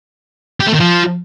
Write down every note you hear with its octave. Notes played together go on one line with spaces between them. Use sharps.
G4
A3
D#3
F3